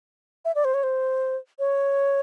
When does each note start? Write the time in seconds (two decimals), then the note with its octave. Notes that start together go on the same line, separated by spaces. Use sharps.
0.45 E5
0.55 D5
0.65 C5
0.74 C#5
0.83 C5
1.59 C#5